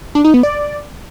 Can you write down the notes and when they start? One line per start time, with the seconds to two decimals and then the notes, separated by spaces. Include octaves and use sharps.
0.15 D4
0.24 D#4
0.34 B3
0.43 D5